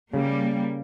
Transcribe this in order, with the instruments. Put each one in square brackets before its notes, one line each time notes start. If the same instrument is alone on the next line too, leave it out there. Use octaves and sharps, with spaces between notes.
[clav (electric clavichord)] C#3 [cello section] G3 A#3